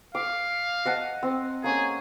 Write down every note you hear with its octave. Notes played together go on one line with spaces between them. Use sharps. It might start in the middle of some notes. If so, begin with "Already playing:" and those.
F5 D6
D#5 F#5 A5
C4
A#3 C#4 G#4